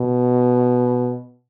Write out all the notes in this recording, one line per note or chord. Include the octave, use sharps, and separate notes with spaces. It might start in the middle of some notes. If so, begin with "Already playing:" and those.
Already playing: B2